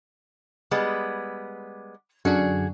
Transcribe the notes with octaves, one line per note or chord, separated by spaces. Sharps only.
G3 G#3 B3
F#2 D3 D4 F#4 G#4